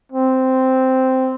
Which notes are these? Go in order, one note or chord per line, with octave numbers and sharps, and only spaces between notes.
C4